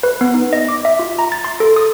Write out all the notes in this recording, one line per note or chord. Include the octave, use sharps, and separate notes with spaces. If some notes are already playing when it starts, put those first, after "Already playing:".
B4
B3
D#4
D#5
D6
E5
F4
A#5
A6
C6
A4
D#6